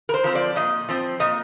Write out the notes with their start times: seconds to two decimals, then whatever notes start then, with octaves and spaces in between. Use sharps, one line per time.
0.09 A#4
0.14 C5
0.24 F3 C4
0.35 D5
0.56 A#2 D#5
0.89 F3 C4
1.20 A#2 D#5